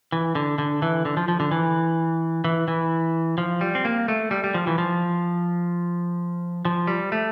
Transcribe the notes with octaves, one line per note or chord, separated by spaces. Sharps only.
E3
D3
D3
E3
D3
F3
F3
D3
E3
E3
E3
F3
G3
C4
A#3
A3
G3
G3
F3
E3
F3
F3
G3
A3